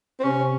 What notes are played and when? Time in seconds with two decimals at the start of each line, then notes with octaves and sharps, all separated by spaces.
0.20 C4
0.24 C3 C#4